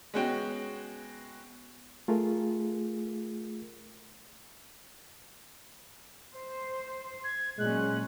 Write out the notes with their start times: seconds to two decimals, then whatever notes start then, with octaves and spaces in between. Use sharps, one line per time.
0.14 G#3 B3 C#4 F#4 G5
2.08 A3 F4 G#4 A#4
6.33 C5
7.24 G#6
7.59 A#2 F#3 G#3 C#4 F#6